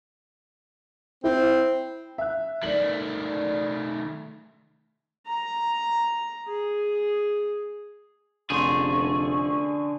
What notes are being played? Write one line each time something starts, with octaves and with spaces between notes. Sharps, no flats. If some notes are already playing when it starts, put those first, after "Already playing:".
C4 E4
E5 F#6
D#3 A3 D5 F#7
A#5
G#4
F1 D3 C#4 G#4 C6 C#6